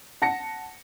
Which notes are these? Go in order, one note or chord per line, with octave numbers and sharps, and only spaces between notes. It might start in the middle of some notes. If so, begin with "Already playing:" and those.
F#5 A5 A#6 C#7